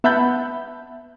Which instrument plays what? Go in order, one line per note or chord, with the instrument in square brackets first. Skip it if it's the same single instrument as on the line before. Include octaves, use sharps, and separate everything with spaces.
[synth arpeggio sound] B3 E5 F#5 A5 B5 G6